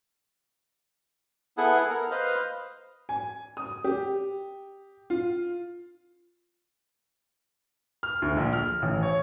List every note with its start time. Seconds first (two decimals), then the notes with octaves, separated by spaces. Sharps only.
1.58 B3 E4 G#4 A4 F#5
1.89 A#4
2.11 B4 C5 D#5 F5
3.09 G#5
3.57 D#6
3.84 G4
5.10 F4
8.03 F6
8.22 D2
8.37 A#1
8.53 F6
8.82 A1
9.03 C#5